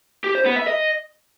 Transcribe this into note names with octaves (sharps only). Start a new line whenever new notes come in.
G4
C5
B3
E5
D#5